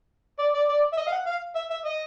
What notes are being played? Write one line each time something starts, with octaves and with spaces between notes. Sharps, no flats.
D5
D5
D5
E5
D#5
F5
F#5
F5
E5
E5
D#5